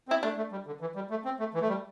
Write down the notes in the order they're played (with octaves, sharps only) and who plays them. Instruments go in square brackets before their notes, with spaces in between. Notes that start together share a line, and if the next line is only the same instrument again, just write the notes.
[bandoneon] C4
[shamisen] E4
[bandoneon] A3 [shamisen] D4
[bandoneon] A3
G3
D3
E3
G3
A3
C4
A3
E3
A3
G3